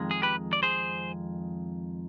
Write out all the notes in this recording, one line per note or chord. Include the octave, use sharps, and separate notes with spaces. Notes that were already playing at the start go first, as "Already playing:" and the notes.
Already playing: F2 D#3 G#3
G#4
G4 B4
D5
G#4 C5